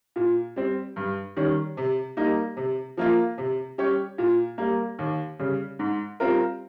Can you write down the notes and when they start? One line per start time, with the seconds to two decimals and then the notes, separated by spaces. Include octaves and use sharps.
0.16 A#2
0.56 G3 C4
0.96 G2
1.36 D#3 G3 C#4
1.77 C3
2.17 G3 A#3 D#4
2.57 C3
2.97 F3 A#3 F4
3.38 C3
3.78 G3 C#4 G4 C#5
4.18 A#2
4.58 G3 A#3
4.99 D#2
5.39 C#3 G3
5.79 G#2
6.20 G3 C4 F4 A#4